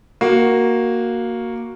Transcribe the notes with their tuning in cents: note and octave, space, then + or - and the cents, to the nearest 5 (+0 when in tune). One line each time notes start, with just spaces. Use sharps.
A#3 +0 F#4 +0